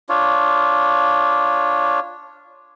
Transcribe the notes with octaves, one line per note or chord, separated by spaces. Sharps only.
D4 F4 C#5